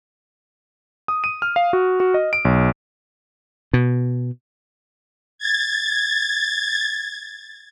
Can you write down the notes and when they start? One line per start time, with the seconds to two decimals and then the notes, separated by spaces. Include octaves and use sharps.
1.08 D#6
1.24 D#7
1.42 F6
1.56 F5
1.73 F#4
2.00 F#4
2.14 D#5
2.33 D7
2.45 B1
3.73 B2
5.38 G#6 A6